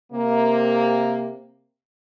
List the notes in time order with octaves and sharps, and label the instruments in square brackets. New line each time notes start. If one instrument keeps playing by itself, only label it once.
[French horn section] C3 A#3